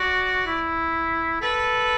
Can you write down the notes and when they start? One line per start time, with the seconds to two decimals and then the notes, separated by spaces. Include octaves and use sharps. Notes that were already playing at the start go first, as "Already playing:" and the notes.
Already playing: F#4 D5
0.47 E4
1.42 A4 B4